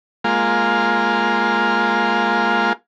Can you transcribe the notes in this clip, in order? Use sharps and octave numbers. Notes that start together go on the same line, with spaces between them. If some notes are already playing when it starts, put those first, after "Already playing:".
G#3 A#3 F4